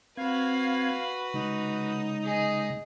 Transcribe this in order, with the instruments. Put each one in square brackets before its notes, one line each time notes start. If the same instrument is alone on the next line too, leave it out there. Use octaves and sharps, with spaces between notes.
[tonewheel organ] C4 G#6 [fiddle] F#4 B4 [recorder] F5
[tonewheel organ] C#3 G#3 [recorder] D#4
[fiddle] G#4 D#5